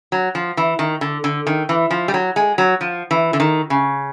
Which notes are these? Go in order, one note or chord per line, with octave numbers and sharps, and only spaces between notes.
F#3
F3
E3
D#3
D3
D3
D#3
E3
F3
G3
F#3
G#3
F#3
F3
E3
D3
D#3
C#3